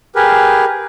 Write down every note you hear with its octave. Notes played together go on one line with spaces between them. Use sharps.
G4 G#4 A#4 B4